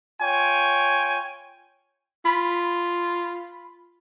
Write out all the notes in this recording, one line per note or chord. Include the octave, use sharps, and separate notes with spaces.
F4 C#5 G5 G#5
F4 B5